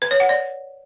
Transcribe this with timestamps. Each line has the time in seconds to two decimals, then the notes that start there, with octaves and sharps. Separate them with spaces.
0.02 B4
0.11 C#5
0.20 F#5
0.29 D5